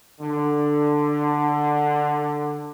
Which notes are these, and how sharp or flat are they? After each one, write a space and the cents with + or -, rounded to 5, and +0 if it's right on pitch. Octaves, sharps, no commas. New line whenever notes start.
D3 +10